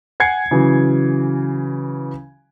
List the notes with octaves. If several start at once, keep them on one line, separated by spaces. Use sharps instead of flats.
F#5 G#5 G#6 C7 C#7
C#3 E3 F#3